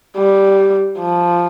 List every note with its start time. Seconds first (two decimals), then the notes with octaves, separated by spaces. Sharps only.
0.17 G3
0.99 F3